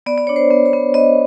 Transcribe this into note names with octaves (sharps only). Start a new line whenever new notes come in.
B3 D5
D5
D4 C#5
C5
B3
C#5
B3
B3 D#5